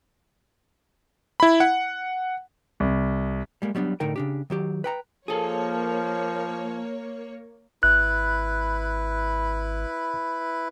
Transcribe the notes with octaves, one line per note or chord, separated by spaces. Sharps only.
E4 B5
F#5
C2
G3 G#3 A#3
F#3 G3 B3 D4
A2 D3 D#4 A#4 G5
C#3 D4 G4
D#3 F#3 G4
B4 G5 A#5
F3 A#3 G#4 A4 C#5
G#1 E4 B4 F#6